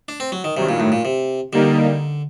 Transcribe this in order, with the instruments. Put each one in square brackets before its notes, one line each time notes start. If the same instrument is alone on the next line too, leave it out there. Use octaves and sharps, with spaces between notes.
[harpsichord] D4
C4
F#3
D#3
[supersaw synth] G2 D#3 F#3 [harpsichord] C3
[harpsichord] A#2
A2
A#2
C3
[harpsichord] D3 [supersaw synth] G3 A#3 D#4